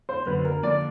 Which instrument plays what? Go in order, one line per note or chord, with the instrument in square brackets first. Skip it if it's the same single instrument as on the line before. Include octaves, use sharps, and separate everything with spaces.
[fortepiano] C5
[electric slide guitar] F#2 D3 F#3 A#3 [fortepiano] B4
[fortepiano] A#4
[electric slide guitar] D3 F3 A#3 D4 [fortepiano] D5